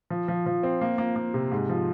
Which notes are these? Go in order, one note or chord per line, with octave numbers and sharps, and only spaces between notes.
F3
F3
F3
C4
A#3
A#3
A#3
C3
G#2
F3